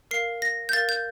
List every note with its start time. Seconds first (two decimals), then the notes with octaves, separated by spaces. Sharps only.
0.11 A#4 F5 C7
0.42 A#6
0.69 G6
0.73 A#4 F5 A6
0.89 G6